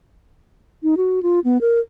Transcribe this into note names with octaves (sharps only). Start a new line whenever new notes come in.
D#4
F#4
F4
B3
A#4